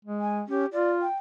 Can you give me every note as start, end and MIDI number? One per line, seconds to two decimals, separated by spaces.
0.05 0.43 56
0.21 0.38 80
0.48 0.66 61
0.48 0.66 67
0.73 1.05 65
0.73 0.90 74
1.02 1.16 79